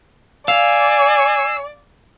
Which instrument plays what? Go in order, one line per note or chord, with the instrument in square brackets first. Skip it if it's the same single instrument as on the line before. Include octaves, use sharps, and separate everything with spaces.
[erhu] D5 [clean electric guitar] F5 [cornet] G#5 [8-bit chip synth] E6 C7